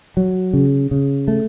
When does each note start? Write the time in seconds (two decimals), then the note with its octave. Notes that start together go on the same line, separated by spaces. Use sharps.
0.17 F#3
0.53 C#3
0.91 C#3
1.28 A3